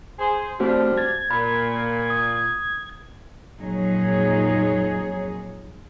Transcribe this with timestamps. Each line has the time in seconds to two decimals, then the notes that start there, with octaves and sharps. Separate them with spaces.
0.19 G#4 C5
0.60 F3 G3 A3 C4 D4 F#4 C5
0.98 G#6 A6
1.31 A#2 B5
2.10 D#6
3.59 F2 A#2 F#3 D#4 G#4 C#5